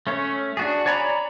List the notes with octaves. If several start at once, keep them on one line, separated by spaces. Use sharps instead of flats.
A3 C#4 C#5
D4 F#4 G#4
C#5 D5 G#5 A#5 B5